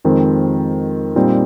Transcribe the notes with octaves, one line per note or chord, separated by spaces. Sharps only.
F2 D#3 G#3 C4
A#2 G3 C4 D#4